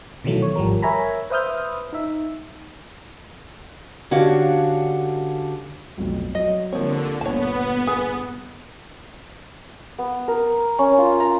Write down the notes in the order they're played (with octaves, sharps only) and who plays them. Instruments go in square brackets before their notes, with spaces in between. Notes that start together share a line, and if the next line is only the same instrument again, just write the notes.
[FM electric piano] B2 D#3 E3 F#3 A3
C#5
G#1 F3 G3 A#4
A#4 C#5 E5 G#5 A#5 B5
B4 C5 E5 D#6 F6 G6
D#4 E5
[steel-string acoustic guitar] D3 C#4 D4 F#4 G4 F5
[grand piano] B1 F2 A2
[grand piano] F#3 [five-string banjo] D#5
[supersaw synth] D3 [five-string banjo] F3 C#5 [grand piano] G3 A#3 C4
[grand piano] G1 A#2 [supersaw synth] B3 [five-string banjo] C#5 A5
[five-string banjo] G#4
[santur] B3
A#4
C#4
F4
A#5